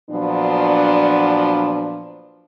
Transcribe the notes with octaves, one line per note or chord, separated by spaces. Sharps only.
A#2 F3 F#3 B3 D4